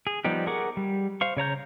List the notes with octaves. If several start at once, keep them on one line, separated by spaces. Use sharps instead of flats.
G#4
F3 G3 B3 D#4 G4
G#4 A#4 F#5 C#6 D6
G3
C5 F5 C#6
C#3 C#5 A#5 G6